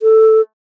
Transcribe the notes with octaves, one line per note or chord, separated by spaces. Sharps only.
A4